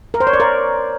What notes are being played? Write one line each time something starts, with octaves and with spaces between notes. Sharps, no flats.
A#4
C5
C#5
D5
A#4